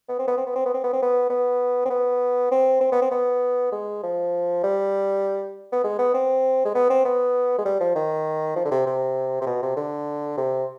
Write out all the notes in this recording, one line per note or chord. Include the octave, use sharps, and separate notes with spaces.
B3
C4
B3
C4
B3
C4
B3
C4
B3
C4
B3
B3
C4
B3
C4
C4
B3
C4
B3
G#3
F3
G3
B3
G#3
B3
C4
G#3
B3
C4
B3
G#3
G3
F3
D#3
F3
D3
C3
C3
C3
B2
C3
D3
C3